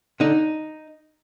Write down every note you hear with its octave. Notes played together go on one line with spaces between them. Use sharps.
D3 D#4